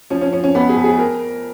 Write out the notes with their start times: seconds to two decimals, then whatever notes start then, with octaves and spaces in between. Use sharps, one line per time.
0.10 F3 C#4
0.21 C#4
0.32 F3 C#4
0.44 C#4
0.55 F2 B3
0.69 G#4
0.77 F2
0.84 G#4
0.99 A#4